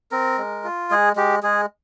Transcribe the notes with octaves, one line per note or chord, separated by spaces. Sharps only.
C4 A#4
G#3
F4
G#3 G#4
G#3 G4
G#3 G#4